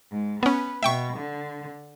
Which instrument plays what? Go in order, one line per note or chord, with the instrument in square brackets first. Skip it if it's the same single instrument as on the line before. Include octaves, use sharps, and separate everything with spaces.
[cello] G#2
[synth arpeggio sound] B3 C#4 [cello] B4
[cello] B2 [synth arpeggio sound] E5 G5 C#6
[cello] D3